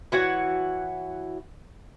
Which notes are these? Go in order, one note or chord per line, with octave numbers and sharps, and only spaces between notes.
E3 F#4 C#5 F#5